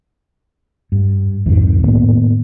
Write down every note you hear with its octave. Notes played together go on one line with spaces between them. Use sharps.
G2
C2 F2 G#2 D#3
A2 D#3 A#3 B3